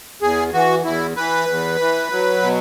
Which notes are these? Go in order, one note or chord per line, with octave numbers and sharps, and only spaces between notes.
E2 G#4
E3 F#4
E2 E4
E3 B4
E2
E3
F#3
B2